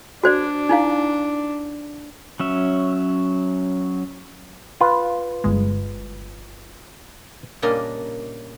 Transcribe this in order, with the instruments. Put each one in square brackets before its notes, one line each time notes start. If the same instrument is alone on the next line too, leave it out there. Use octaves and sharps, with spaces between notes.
[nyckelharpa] D4 [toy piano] F#4 C5 D5
[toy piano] D#4 E4 F5
[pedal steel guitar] F#3 C#4 E5
[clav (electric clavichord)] F4 B4
[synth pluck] G1 G#3
[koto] A#2 C#3 G3 A#3 D4 D#5